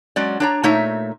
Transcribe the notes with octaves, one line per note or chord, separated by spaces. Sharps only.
F#3 G#3 C#4 D5
D4 C#5 A#5
A#2 A3 D#4 C#5 E5